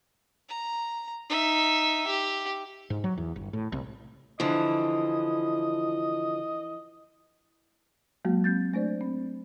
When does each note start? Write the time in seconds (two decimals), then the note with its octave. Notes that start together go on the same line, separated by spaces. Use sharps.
0.49 A#5
1.29 D#4 E5
2.07 G4
2.90 G#2
3.04 F#3
3.17 E2
3.36 G1
3.53 A2
3.72 C2
4.40 D3 E3 F3 D#5
8.25 F#3 G#3 A#3 F#4
8.44 C4 G6 A6
8.74 A3 D4 C5 D5
9.01 C4